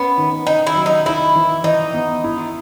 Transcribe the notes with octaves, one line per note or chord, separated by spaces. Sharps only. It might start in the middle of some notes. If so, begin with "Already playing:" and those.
Already playing: B3 C#4
D#3
D#3 D#4
E4
F#3
D#4
D#4 E4
E3
E3 D#4
B3
E4